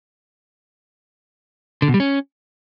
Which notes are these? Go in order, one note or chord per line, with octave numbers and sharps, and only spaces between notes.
D3
B2
G3
C#4